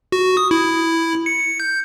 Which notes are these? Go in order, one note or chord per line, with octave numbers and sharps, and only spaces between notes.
F#4
D#6
E4
C#7
G6